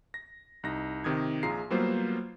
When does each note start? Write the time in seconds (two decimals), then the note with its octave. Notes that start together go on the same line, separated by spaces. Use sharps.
0.14 A#6
0.63 C2 D#4 A#6
1.04 C3 D#3 D#6 G#6
1.43 A#1 F4 G#4 A#5 C7
1.70 F#3 G3 A#3 B3 F4 C5